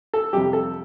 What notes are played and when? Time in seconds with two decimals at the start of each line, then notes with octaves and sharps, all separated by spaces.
0.14 A4
0.33 F2 C3 G3 G4
0.53 A4